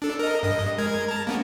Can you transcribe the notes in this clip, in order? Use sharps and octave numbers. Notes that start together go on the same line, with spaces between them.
D4 A4
A#4 D#5
G2 D#5
G#3 A#4 G#6
A5 A#5
A#3 B3 C#4